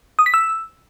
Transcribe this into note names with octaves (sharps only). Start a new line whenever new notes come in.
D#6
B6
E6